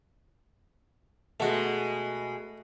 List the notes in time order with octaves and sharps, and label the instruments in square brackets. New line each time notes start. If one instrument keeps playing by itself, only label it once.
[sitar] B2 G#3 [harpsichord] A3 F#4